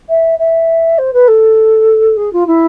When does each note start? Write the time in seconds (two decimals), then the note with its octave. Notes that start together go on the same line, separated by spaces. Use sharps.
0.09 E5
0.39 E5
0.98 C5
1.13 B4
1.28 A4
2.17 G#4
2.33 F4
2.47 E4